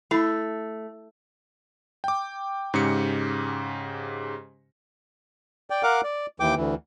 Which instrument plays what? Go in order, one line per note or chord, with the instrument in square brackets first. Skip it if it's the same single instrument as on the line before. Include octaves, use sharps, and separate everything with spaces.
[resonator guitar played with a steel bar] A3 [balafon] E4 B5
[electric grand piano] G5 D6
G#2 C#3 G4 C#7
[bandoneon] D5 G5
A#4 F5 F#5 D6
D5
D#2 E3 G5 D6
D2 E3